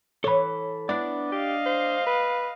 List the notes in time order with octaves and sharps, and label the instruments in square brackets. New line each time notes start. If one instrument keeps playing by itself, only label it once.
[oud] E3 C#5 [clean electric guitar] A4 B5
[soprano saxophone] B3 [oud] D4 E4 [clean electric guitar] D5
[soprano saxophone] G4 [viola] D#5 F5
[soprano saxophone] C5
B4